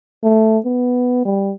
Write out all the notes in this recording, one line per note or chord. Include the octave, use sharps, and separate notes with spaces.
A3
B3
G3